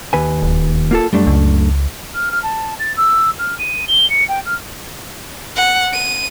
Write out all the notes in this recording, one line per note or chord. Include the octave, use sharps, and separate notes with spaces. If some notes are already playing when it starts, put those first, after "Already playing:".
D#2 B4 G#5
D1
A#3 F4 A4
F#2 G3 A3 D4
C#2
F6
F6
A5
A6
E6
F6
D#7
G7
C#7
G5
F6
F#5
D#7